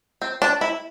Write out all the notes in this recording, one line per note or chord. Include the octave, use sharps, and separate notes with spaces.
C4
D4
E4